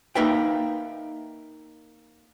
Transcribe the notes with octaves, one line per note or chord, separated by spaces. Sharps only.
A#3 D#4 B4 E5 G5